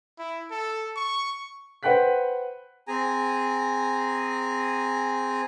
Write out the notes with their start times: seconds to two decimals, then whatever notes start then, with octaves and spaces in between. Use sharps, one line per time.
0.19 E4
0.51 A4
0.96 C#6
1.83 B4 C5 F#5 G5 F#6 B6
2.87 C4 G#4 G#5 A#5